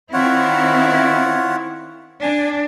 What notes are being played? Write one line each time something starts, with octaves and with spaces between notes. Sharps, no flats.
D#3 C4 E4 F4 C#5 F#5
D4 G#5